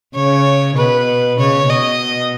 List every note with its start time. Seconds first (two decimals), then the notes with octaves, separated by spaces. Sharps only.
0.15 C#3 C#5
0.77 B2 B4
1.39 C#3 C#5
1.69 B2 D#5